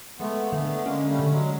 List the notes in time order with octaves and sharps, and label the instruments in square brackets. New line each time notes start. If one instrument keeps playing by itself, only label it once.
[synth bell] G#3 [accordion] A3 B3
[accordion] A#3
[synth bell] D3 [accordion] A3 B3
[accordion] G#3 A#3 [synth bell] C#4
[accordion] G3 A3
[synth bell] D3
[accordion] F#3 G#3